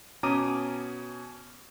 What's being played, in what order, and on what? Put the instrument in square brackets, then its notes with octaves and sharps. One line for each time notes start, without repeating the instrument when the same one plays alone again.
[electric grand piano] B2 C#4 A#5 D6 D#6 D#7